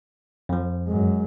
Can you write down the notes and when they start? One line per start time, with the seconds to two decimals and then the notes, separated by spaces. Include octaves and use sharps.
0.49 F2 F3
0.87 F#2 G#3